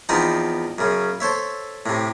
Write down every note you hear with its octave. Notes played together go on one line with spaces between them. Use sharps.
E2 F3 B3 C4 D#4 A5
F#2 C#3
A4 C5 C#5 E5
A2 C3